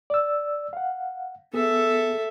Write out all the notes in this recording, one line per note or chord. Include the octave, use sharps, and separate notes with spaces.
D5 E6
F5 F#5
B3 G#4 A4 E5